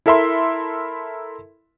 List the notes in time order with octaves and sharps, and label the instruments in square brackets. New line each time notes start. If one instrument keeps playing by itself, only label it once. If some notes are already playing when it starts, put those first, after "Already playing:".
[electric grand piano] E4 A4 A#4 E5 B5 C6